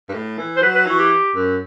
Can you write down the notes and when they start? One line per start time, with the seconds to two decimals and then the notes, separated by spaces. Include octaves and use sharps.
0.09 G2
0.14 A2
0.38 E3
0.57 C5
0.62 F#3 B4
0.75 B4
0.86 E3 F#4
0.99 G4
1.35 F#2